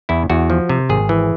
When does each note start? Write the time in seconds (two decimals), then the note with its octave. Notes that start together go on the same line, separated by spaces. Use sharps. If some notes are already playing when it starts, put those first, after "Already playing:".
0.09 E2 E4
0.30 E2 F#4
0.50 F3
0.69 C3
0.89 G#1 G#4
1.09 E3